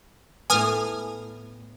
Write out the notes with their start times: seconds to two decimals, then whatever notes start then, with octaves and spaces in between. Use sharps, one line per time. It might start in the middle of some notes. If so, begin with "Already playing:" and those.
0.50 A2 B3 G#5 D#6 F6